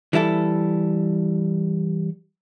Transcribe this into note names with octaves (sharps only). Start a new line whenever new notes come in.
E3 G3 E4 A4